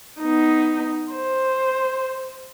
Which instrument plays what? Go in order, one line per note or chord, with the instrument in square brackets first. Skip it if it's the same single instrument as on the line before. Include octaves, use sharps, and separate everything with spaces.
[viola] B3 D#4
C5